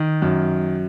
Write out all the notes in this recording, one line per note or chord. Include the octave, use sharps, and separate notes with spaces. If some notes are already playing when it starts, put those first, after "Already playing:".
Already playing: D#3
F#2